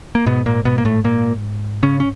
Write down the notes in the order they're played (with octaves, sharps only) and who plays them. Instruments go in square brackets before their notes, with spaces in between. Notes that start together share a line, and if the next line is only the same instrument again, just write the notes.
[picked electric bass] A#3
G#2 B2 B3
A#2 A#3
B2 B3
A#3
A2 A3
A#2 A#3
C#3 C#4
C#4